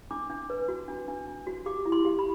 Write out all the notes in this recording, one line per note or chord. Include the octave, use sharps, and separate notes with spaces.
D4 D6
D4
B4
F#4
D4
D4
D4
F#4
G4 D6
E4
C6
G4
B5